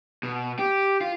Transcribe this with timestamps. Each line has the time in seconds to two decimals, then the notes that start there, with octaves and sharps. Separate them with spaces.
0.23 B2
0.59 G4
1.01 F4